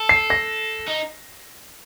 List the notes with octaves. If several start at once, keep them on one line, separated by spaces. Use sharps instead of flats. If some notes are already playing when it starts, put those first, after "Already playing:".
Already playing: A4
C7
A#6
D#4